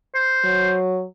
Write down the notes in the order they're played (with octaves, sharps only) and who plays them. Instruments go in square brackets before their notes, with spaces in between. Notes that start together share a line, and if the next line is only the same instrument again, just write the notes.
[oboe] C5
[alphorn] F#3